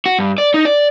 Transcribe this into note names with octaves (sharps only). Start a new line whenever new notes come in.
F#4
G2
D5
D#4
D5